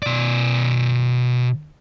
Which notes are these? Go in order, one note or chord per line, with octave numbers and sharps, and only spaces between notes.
B2 D5